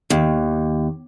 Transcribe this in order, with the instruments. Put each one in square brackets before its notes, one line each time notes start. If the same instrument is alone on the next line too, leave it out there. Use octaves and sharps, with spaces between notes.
[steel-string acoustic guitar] D#2